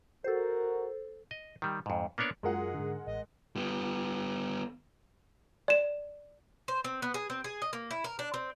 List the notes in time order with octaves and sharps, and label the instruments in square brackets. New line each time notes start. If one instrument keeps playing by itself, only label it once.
[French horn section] F#4 A#4 [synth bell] A4 C5
[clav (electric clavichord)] D#5
D#3 G3
F2 G#2
A#3 B3 D4 C#5 D5
[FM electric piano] F#2 F#3 F4 [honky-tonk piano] G#3 A#4 F#5 [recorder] G#4
[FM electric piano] G#2 D3
[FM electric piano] A1 [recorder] D#5
[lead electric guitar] G3 B3
[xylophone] D5 E7
[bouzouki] C5
C4
B3
G#4
C4
G#4
D#5
A#3
E4
A#4
D4
C4